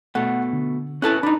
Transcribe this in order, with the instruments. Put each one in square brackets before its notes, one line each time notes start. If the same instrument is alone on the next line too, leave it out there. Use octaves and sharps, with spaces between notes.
[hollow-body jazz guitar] B2 A3 [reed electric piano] F#5
[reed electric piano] D3
[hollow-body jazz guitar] C#4 B4 A5 [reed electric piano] E4 A4 F#6
[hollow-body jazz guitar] D4 D#4 [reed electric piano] A#5 B5